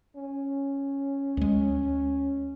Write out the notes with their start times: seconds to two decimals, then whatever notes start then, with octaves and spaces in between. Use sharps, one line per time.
0.16 C#4
1.37 D2 G#3